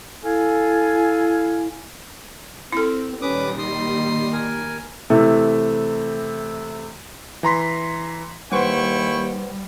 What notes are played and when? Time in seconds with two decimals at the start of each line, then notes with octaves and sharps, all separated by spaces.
0.24 E4 A4 F5 G#5
2.72 C4 E4 A4
3.22 A#2 D#3 G3 C#4 B4 D6 D#6
3.58 D#4 C6 D#6
4.33 A#4 G#5
5.10 C3 E3 A3
7.43 E3 A#5 C6 B6
8.52 D#2 G3 E4 B4 C5 F#5 G5 C#6